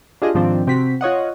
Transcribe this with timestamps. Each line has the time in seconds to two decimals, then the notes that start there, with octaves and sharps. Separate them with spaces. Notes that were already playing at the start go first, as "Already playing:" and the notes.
0.22 D4 F4 G4 G#4 D#5
0.34 G#2 D#3 F3 C4 D4
0.67 C3 C4 F#4 B6
1.01 F4 C#5 D#5 F#5